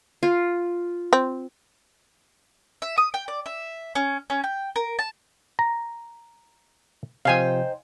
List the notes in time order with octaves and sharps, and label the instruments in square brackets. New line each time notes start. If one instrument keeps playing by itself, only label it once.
[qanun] F4
[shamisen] C4
[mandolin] E5
D#6
G5
D5
E5
C#4
C#4
G5
A#4
A5
[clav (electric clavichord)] A#5
[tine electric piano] C3 F3 [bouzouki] D#4 C5 G5 [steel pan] F5 G#5